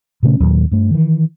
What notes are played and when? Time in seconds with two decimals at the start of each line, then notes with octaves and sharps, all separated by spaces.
0.23 A#2 C#3 A3 C#4
0.40 D#2 A#2 F#3
0.71 G2 A3
0.91 D#3 E3